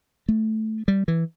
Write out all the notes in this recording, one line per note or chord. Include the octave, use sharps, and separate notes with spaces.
A3
G3
E3